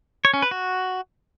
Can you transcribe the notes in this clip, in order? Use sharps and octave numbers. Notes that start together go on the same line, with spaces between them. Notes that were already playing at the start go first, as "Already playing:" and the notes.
C#5
C#4
B4
F#4